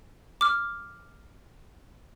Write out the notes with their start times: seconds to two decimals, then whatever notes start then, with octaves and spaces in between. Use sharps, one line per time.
0.41 D6 F6